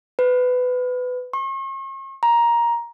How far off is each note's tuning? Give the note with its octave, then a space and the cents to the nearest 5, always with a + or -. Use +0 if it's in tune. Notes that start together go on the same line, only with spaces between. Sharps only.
B4 +20
C#6 -45
A#5 +15